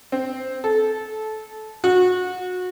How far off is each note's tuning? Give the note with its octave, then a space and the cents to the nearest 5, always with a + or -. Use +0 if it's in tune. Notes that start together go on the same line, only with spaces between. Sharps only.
C4 -5
A4 -20
F#4 -25